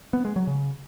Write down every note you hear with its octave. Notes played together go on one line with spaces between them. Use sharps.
B3
G#3
F#3
C#3